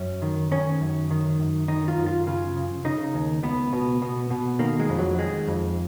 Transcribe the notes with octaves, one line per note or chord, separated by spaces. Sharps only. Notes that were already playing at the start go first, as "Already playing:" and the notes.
Already playing: F#2 C#4
D#3
D#3 C#4
F#2
D#3
F#2
D#3 D#4
F4
F#2
F4
C#3 F4
C#3
C#3 D#4
D#2
C#2 B3
B2
B2
B2
D#3 A#3
G#3
F2
F#3
D#3 G#3
F2